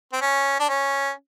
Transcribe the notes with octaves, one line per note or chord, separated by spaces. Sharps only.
C4
C#4
D4
C#4